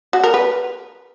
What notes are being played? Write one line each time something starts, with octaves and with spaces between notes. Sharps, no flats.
F#4
A#4
B4